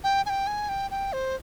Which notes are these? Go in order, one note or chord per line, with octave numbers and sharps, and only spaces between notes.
G5
G#5
G5
G#5
G5
G5
C5